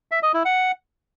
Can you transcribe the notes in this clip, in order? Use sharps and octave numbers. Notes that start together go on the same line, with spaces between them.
E5
D#5
E4
F#5